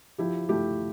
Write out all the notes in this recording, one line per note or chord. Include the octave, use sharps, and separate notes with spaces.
F3 E4 G4
A3 E4 G4